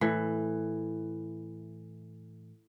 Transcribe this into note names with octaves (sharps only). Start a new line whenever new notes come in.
A2 E3